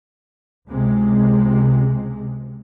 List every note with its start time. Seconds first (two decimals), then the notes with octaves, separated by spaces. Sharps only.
0.67 C#2 C3 G#3